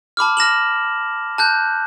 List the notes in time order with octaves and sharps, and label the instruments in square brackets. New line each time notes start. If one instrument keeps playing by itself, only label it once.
[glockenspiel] A5 B5 D6 F6
F6 A#6 E7 F#7
A5 F#6 G6